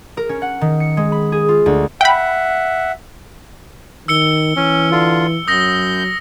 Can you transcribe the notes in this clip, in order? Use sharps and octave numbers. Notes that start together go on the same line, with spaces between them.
A#4
C#4
F#5
D#3
C#7
G#3
B5
G#4
F4
D2
E5 F#5 G5 B5
D#3 E6 C#7 G7
E3 C#4
D3 F4
F#2 F#3 D#6 G6 A#6